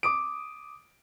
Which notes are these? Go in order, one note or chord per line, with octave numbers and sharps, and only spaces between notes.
D6 D#6 D7